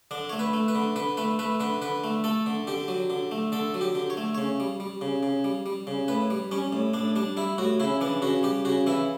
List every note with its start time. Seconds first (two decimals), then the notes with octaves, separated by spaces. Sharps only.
0.11 D3 D4
0.29 A3 C#5
0.39 B4
0.53 A3
0.68 B4
0.75 D3
0.96 D3 B4
1.17 A3 B4
1.39 A3 B4
1.60 D3 B4
1.82 D3 B4
2.04 A3
2.24 A3 A4
2.46 D3
2.67 D3 G4
2.88 F#3
3.10 D3
3.31 A3
3.52 D3 A4
3.74 F#3
3.81 G4
3.95 D3
4.10 C#5
4.17 A3
4.35 C#3 C#5
4.60 G3
4.80 G3
5.01 C#3
5.23 C#3
5.44 G3
5.66 G3
5.87 C#3
6.08 A2 B4
6.30 G3
6.52 G3 C#4
6.73 A2
6.94 A2 D4
7.16 G3 D4
7.37 G3 E4
7.58 A2 F#4
7.80 C#3 E4
8.01 E3 D4
8.22 C#3 F#4
8.43 G3 G4
8.65 C#3 F#4
8.87 E3 E4